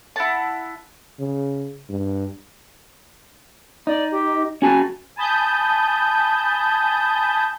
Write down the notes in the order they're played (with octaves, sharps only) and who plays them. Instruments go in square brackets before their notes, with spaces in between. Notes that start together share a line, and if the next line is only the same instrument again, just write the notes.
[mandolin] E4 F#5 A5
[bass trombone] C#3
G2
[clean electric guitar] D#4 [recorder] D5
[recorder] G4
[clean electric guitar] C#4 F#4 A5 [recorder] G#5
[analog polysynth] G#5 A5 B5 D#6 G6